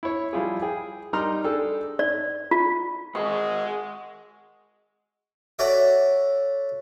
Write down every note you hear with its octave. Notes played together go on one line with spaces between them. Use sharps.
E4 C#5
F3 G3 E4 F4 G#4
G#4 G5
G3 D#4 A#4 A#5 C6 F6
D4 G#4 A4 G5
D5
F4
G#3 G#4 A#4 D#5 F#5 C#6
F#4 A4 C#5 D5 E5